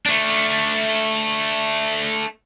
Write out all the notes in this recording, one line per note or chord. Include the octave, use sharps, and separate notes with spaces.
A3 D4